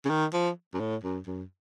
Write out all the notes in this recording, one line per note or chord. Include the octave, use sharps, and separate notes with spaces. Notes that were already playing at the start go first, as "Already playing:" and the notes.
C#3
D#3
F3
F#2
A2
F#2
F#2